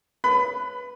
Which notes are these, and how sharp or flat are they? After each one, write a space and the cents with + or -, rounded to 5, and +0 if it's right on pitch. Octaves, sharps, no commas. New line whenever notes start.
B4 -5 B5 +30